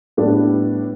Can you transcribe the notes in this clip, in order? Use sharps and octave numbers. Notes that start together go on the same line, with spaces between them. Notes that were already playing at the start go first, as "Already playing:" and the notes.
A2 G3 B3 D4